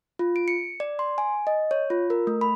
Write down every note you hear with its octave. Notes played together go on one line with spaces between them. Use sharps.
F4
D7
C#7
D5
C6
G#5
D#5
C#5
F4
A#4
A3
B5